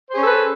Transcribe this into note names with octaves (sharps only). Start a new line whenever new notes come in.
C#4 G#4 A4 B4 C5